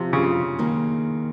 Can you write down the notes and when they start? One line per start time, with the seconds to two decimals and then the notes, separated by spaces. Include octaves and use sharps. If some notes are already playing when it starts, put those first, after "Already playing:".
Already playing: C3 F3 C4 F4
0.13 C#3
0.59 D#3 A#3 D#4 G#4